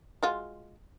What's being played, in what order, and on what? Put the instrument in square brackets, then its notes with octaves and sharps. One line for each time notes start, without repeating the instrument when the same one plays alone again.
[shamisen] G#3 F4 F#4